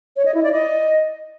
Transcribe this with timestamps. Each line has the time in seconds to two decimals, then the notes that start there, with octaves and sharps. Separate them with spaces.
0.16 C#5
0.25 D#5
0.34 E4
0.43 D5
0.52 D#5